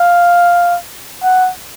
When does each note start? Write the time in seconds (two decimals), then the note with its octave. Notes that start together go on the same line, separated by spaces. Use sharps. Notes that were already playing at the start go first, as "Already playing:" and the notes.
Already playing: F5
1.23 F#5